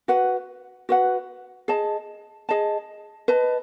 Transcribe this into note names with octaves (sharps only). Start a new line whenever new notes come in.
F#4 B4 F#5
F#4 B4 F#5
G#4 D#5 A5
G#4 D#5 A5
B4 D#5 A5